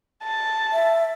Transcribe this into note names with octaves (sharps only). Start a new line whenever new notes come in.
A5
E5